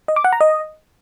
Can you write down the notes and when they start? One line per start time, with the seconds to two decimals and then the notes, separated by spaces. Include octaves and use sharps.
0.08 D#5
0.16 D6
0.24 F#5
0.33 A#5
0.41 D#5